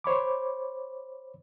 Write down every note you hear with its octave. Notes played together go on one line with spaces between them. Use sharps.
C5 C#5 B5 D6